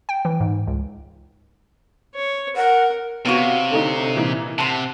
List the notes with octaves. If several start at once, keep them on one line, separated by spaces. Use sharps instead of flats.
G5
E3
G#2
C#2
C#5
A#4 F#5
C3 B3 F#4 C#5 F5 C#6
D3 A3 D#4
A#2 E3 D#4
C3 F#5 A5 C6